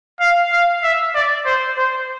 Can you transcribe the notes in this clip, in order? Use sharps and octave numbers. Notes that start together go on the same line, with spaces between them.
F5
F5
E5
D5
C5
C5